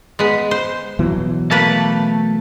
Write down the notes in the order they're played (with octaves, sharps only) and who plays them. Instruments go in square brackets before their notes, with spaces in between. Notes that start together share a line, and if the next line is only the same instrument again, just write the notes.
[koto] G#3 B3
C5
[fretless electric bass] B2 E3 F#3
[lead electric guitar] A3 A5 [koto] A#3 B4